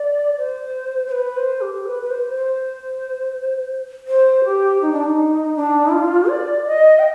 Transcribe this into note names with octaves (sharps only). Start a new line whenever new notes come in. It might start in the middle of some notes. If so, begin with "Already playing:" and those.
Already playing: D5
C5
C5
B4
C5
G4
B4
B4
C5
C5
C5
G4
D#4
D4
D#4
D4
F4
D5
D#5
G5